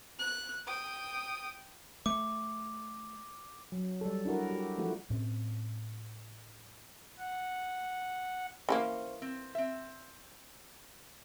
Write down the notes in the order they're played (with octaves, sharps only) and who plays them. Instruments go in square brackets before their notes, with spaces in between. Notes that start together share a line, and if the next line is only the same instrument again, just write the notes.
[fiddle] F#6
G5 D#6
[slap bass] A3 [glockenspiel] D6
[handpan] F#3
G3 A4
D4 E4 F#4 A#4
G4
E3 F3 A3 F#4
[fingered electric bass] A2 C4 C#4
[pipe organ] F#5
[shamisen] E3 G#3 A#3 [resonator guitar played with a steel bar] C#4 C5
[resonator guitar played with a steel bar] C4
C4 E5